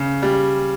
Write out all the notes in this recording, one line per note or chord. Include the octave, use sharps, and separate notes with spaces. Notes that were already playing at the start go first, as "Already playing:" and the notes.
Already playing: C#3
G3